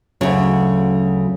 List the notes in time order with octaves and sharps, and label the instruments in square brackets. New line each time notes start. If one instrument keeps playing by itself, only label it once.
[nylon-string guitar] D2 C#3 [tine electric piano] F#3 C#4